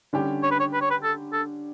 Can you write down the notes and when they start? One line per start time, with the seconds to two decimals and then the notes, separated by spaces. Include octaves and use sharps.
0.13 D3 G3 C#4 G4
0.43 C#5
0.51 B4
0.60 C#5
0.73 B4
0.81 C#5
0.91 B4
1.03 A4
1.33 A4